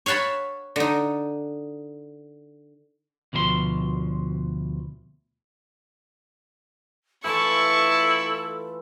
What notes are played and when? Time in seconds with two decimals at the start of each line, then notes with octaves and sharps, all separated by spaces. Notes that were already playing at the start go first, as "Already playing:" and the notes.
0.06 C#5 F5 F#5 A5 B5
0.76 D3 D#4
3.33 D2 B2 F3 F#4 C6
7.25 E3 A3 E4 F4 A4 A5 C#6